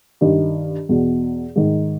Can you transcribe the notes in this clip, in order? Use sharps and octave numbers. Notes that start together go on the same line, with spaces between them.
G2 D#3
E2 B2
G#2 D#3